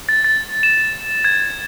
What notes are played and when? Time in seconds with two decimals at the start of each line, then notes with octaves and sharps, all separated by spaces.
0.09 A6
0.25 A6
0.63 E7
1.25 G#6